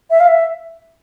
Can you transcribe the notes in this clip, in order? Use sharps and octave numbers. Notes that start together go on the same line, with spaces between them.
E5
F5
E5